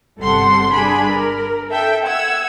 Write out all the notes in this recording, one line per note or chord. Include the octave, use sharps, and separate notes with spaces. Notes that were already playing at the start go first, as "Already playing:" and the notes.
G1 C3 G3 A4 F#5 C6
G2 D4 G#4 B5
A#4
A4 E5 G5
F#5 E6 G#6